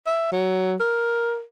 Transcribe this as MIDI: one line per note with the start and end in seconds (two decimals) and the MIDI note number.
0.07 0.31 76
0.32 0.75 54
0.80 1.42 70